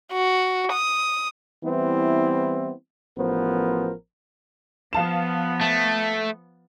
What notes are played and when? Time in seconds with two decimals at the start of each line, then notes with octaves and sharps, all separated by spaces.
0.13 F#4
0.72 D#6
1.64 E3 G3 B3 C4 E4
3.18 A1 F3 B3 A#4 C5
4.93 F3 B3 F5 A5 E7
5.61 A3